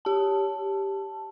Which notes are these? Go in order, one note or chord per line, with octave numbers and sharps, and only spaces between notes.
G4 A5